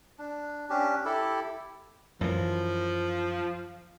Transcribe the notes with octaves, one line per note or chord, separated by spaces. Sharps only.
D4
C#4 D4 G4
E4 G4 A4
F#2 E3 F3